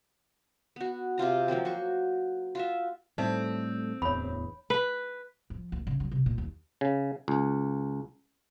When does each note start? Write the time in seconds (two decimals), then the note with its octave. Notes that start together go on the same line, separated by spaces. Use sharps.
0.76 B3 F#4
1.18 C3 C4 F4 A#5
1.48 F3 F#3 A#3 C4
1.65 F#4 C5 C#6
2.55 F4 F#4 E5
3.18 A2 G3 A3 C4 D#4
4.02 D1 E2 C#5 B5
4.70 B4
5.50 F3
5.72 D2
5.87 C#3
6.00 F#3
6.12 C3
6.26 A#2
6.38 D#2
6.81 C#3
7.28 C#2